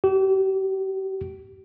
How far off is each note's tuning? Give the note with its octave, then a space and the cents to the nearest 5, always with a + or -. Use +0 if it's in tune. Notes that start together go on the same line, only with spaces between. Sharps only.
G4 -40